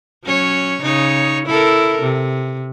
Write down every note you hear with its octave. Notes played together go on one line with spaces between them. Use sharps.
F#3 C#4 C#5
C#3 D#4 C#5
E4 A4 A#4
C3